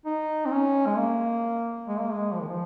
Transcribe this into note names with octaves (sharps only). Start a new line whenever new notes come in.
D#4
C4
C#4
G#3
A#3
G#3
A#3
G#3
F3
D#3
F3